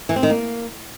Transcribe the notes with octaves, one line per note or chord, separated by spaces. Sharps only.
E3
C4
D#3
A#3